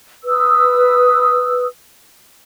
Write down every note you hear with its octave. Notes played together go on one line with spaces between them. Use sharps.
B4 D#6 E6